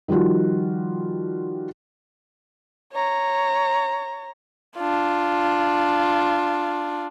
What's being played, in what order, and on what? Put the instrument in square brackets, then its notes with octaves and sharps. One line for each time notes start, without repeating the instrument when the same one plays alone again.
[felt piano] D#3 F3 G3 F4 F#4
[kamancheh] C#5 A#5
D4 F4